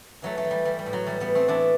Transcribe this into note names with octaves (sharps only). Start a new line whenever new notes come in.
E3 F#3 A3
F#3 A3
E3
G3
E3 G3
G3
A2
F#3
E3 G3
G3 B3
A2
A3 C4
E3 B3 D4